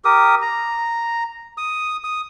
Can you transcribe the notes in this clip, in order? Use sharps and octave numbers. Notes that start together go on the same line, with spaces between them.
G4 A#4 D#6
A#5
D#6
D#6